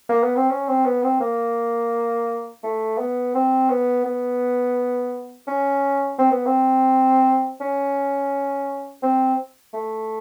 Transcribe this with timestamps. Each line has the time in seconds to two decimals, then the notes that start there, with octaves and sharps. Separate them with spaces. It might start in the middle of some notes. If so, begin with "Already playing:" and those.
0.09 A#3
0.23 B3
0.36 C4
0.50 C#4
0.68 C4
0.86 B3
1.03 C4
1.21 A#3
2.63 A3
2.99 B3
3.35 C4
3.70 B3
4.05 B3
5.48 C#4
6.18 C4
6.31 B3
6.46 C4
7.61 C#4
9.03 C4
9.73 A3